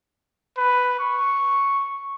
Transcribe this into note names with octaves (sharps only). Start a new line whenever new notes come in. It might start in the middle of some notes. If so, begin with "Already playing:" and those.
B4
C#6